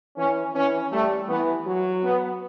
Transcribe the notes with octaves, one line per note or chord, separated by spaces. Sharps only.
E3 C#4
E3 C#4
G3 A3
E3 B3
F#3
B3